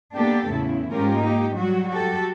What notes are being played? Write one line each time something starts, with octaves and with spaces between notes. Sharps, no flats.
A#3 B3 D4 G4 A4
E2 A2 C#3 E4
G#2 G#3 C#4 F4 G4 A#4
A#3 D#4 G4
F#3 G3 F#4
F#4 G4 A4